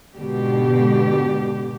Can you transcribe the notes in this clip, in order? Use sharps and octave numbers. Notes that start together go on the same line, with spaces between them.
G#2 B2 D3 G4